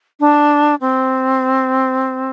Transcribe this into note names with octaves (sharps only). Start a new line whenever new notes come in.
D4
C4